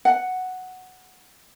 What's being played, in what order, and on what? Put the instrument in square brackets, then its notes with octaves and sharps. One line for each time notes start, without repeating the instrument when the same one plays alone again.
[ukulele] F#5